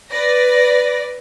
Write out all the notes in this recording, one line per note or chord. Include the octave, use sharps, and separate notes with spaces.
B4 D5 A#6